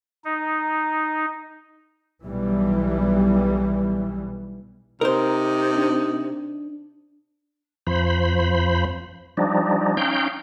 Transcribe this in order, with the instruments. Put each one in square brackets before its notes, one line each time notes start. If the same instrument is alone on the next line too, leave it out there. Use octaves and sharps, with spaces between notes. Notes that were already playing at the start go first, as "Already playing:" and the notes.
[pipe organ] D#4
[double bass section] B1 B2 E3 G3
[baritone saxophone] C3 [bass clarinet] D#4 [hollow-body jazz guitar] A#4 C5
[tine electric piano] D4
[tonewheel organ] F2 F3 C5 B5
F3 G3 D4 D#4
C#4 D#4 F5 G5 G6